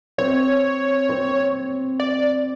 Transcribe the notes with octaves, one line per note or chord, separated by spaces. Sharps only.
C4 C#5
C4
D5